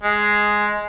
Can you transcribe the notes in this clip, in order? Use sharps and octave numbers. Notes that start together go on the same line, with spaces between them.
G#3